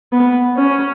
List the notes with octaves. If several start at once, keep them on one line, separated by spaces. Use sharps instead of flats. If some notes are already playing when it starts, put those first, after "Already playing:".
B3
C#4